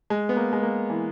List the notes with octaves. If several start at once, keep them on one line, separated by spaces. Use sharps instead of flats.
G#3
B3
A#3
G#3
A#3
E3